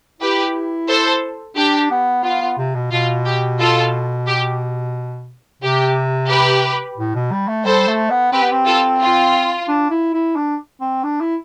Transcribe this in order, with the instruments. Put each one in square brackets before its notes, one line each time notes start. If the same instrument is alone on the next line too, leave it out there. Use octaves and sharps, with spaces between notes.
[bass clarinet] E4 [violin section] G4 B4
[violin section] A4 C5
[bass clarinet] D4 [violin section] G4
[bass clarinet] B3
[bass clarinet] B3 [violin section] F4
[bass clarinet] B3
C3
B2
[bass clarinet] B2 [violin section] F4
[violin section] G4
F4 A4
G4
[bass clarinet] C3 [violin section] G4
[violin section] G4 B4
[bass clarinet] A2
B2
G3
A3
[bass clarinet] G3 [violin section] A4 C5
[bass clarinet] A3
B3
[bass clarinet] C4 [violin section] G4 B4
[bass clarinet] B3
C4
[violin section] F4 A4
F4
[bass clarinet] D4
E4
E4
D4
C4
D4
E4